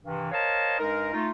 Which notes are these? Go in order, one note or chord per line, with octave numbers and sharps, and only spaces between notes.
G2 C3 D#3 E3
A#4 C5 C#5 D#5 F5 A5
G2 G#3 D#4 A#4
A3 D#4 F4